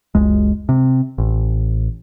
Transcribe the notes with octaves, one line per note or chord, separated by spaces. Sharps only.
F#1 C#2 G#3
C3
A1